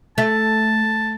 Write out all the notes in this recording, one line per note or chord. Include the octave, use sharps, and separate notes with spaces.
A3 A5